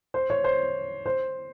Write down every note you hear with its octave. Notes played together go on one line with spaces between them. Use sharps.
C5
C#5
C5
C5